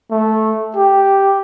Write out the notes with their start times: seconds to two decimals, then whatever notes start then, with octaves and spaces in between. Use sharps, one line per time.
0.11 A3
0.76 G4